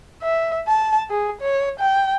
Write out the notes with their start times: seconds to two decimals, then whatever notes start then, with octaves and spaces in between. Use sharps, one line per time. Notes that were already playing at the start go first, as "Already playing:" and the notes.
0.23 E5
0.68 A5
1.10 G#4
1.41 C#5
1.79 G5